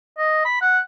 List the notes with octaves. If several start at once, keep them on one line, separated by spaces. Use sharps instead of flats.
D#5
B5
F#5